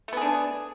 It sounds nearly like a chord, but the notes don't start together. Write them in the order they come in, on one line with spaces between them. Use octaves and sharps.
A3 B3 G#4 D4